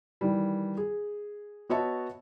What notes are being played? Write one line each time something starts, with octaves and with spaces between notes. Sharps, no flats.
D#3 E3 G3
G#4
B3 F#4 C#5 D#5 E5 A5